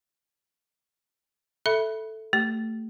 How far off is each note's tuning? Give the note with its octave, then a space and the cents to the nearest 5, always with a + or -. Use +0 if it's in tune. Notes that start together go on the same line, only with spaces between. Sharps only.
A4 +0 E5 +0 B5 -15
A3 +25 G4 -10